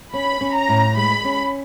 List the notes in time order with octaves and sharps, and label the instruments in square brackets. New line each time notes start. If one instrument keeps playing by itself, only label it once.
[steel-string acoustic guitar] C#4 [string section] B5
[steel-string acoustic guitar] C#4
[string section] A#5
[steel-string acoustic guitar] A2
[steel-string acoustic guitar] G#3 [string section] B5
[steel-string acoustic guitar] C#4